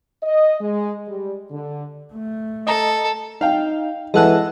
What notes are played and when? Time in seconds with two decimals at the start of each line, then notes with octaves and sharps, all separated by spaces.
0.23 D#5
0.61 G#3
1.07 G3
1.51 D3
2.13 A3
2.67 A4 D#5 A#5
3.41 D#4 F5 G5
4.14 E3 G#3 A4 D#5 F#5 A5 F#6